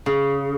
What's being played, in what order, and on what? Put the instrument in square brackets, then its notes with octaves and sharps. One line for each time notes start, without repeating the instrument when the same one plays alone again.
[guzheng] C#3